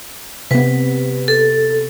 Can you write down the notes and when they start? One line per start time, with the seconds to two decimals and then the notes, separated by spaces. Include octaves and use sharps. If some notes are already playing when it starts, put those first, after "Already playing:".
0.51 C3 B3 B4
1.28 A4